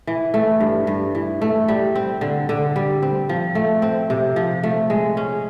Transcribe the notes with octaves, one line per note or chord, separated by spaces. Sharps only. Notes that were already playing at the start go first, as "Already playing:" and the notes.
E3
A3
G2
G2
E3
A3
G3
C4
D3
D3
G3
C4
F3
A3
C4
C3
F3
A3
G#3
C#4